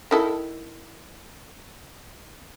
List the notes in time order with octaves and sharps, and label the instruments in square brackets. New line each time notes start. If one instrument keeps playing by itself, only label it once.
[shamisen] D#3 E4 A4